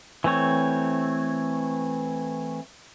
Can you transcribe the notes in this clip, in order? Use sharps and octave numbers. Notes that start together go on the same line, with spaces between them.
E3 A3 C4 C#5